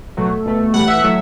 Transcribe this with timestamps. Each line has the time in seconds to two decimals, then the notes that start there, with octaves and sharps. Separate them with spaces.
0.17 B2 F#3 A3
0.46 B2 A3
0.74 A2 E3 G3 F#5
0.88 E5
1.01 A2 F#3 A3